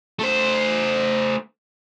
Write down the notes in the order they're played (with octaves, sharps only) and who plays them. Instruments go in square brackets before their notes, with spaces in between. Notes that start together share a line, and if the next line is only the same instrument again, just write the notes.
[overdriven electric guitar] A3 C5